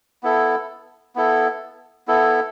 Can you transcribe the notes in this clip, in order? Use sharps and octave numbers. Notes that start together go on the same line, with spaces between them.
B3 E4 A4
B3 E4 A4
B3 E4 A4